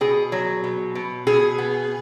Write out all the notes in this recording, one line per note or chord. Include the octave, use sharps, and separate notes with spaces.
B2 G#4
F#3
B2
B2
B2 G#4
B3